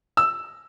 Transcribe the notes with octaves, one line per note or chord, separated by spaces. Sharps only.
E6